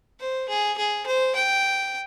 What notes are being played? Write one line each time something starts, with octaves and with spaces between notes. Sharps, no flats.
C5
G#4
G#4
C5
G5